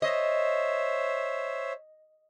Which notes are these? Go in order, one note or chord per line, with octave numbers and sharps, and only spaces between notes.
C5 C#5 D#5 E5